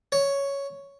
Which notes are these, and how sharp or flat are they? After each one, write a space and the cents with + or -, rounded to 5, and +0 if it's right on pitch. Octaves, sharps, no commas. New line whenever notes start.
C#5 +5